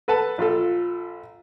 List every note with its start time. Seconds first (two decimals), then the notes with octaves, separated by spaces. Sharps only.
0.08 A4 B4 F#5 A5 B5
0.38 A#1 F4 A4